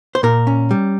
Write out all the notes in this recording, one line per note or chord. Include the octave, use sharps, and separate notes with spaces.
C5
A#2 A#4
C#4
G3